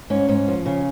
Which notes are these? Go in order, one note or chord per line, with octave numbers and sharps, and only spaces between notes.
G#2 C#4
G#2 C#4
F3
C#3